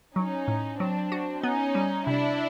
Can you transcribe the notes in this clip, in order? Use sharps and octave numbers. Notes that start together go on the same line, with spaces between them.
F#3 C#4 D#4
A2
F#3 C4 D4
F#4
B3 C#4 D#4
G3
C3 D4 E4